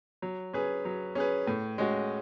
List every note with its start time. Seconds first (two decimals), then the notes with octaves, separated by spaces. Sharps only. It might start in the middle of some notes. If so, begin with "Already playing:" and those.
0.22 F#3
0.53 C#4 G#4 B4
0.85 F#3
1.15 C#4 G#4 B4
1.47 A2
1.78 G#3 C#4 F#4